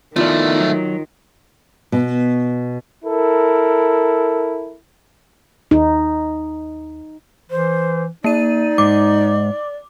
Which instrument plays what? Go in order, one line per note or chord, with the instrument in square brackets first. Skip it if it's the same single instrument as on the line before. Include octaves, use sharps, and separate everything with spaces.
[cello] D#3 [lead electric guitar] F3 A3 [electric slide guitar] B3 E4 D5 [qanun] F4
[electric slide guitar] F#3
[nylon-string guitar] B2
[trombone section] E4 A4 A#4
[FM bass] D#2 [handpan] D#4
[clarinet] E3 [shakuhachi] C5
[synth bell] A#3 D#7 [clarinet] D#4 [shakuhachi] D5
[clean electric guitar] G#2 [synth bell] D6